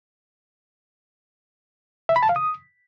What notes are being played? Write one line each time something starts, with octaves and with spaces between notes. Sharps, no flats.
E5
B5
A5
F5
D#6